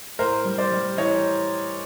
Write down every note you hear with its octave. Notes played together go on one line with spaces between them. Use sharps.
A2 A#4 C5
G3
C5 D5
G3
E3 C#5 D#5